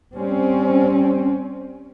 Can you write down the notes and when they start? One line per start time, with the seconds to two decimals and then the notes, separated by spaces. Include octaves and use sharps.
0.16 G3 C4 C#4